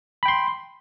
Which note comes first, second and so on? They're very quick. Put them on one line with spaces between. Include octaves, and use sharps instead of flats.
B5 G5 C6